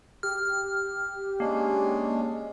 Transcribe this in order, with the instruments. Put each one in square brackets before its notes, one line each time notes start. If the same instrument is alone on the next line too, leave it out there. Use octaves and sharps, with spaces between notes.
[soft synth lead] G4 [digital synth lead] F6
[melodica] G#3 C#4 D4 [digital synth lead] A#3